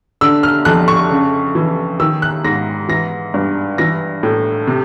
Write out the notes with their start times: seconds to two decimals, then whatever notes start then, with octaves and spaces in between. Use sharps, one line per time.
0.21 D3 E6
0.43 F6
0.65 F2 F#6
0.88 C#6
1.10 C#3
1.55 E3
2.00 D#3 E6
2.22 F#6
2.44 G#2 A#6
2.89 E3 A#6
3.34 G2
3.78 E3 A#6
4.23 A2
4.67 C3